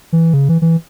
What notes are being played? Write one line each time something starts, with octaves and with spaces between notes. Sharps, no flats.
E3
C#3
E3
E3